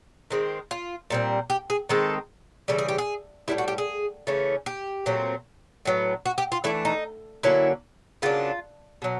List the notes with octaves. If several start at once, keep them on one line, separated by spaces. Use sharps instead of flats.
D#3 G#3 C4
F4
A#2 G3 C4
G4
G#4
D#3 G#3 C4 A4
C#3 E3 G3 A4
G#4
G4
G#4
A2 E3 G3 E4
F#4
G4
G#4
C#3 E3 A3 C#4
G4
A#2 F#3 A3 C4
A2 F#3 B3
F#4
G4
F4
E3 A3 D4 E4
D#4
D3 F#3 A#3 C#4 E4
C#3 F#3 A#3 D4 F4
B2 F#3